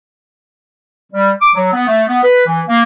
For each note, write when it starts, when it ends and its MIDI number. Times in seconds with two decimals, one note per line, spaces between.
1.12 1.31 55
1.41 1.54 86
1.55 1.72 54
1.73 1.86 59
1.87 2.03 57
2.08 2.20 59
2.23 2.45 71
2.46 2.61 52
2.68 2.83 58